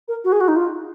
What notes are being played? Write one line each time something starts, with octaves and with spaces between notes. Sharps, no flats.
A#4
F#4
G#4
F#4
D#4
F4